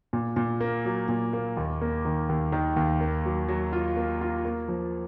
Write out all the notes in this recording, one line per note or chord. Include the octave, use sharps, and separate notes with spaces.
A#2
A#2
A#3
F#3
A#2
A#3
D#2
A#3
D#3
D#2
D#3
D#2
A#3
F#3
F#3
F4
A#3
F4
A#3
F3